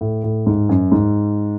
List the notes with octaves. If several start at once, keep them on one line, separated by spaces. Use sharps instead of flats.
A2
A2
G#2
F#2
G#2